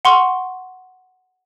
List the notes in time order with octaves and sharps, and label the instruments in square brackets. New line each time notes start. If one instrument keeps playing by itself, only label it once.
[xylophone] F#5 C6 C#6